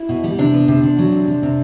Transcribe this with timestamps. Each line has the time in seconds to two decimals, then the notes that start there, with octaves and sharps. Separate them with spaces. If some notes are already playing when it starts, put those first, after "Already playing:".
Already playing: E4
0.09 B2
0.24 G3
0.38 C3 D4
0.54 B3
0.68 C3
0.83 C3
0.98 F#3
1.12 C3
1.28 C3
1.43 C3